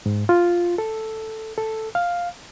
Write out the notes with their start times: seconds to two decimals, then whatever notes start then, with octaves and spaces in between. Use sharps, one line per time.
0.06 G#2
0.29 F4
0.78 A4
1.58 A4
1.95 F5